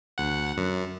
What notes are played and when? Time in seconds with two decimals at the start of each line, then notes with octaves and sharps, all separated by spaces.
0.18 D2 F#5
0.57 F#2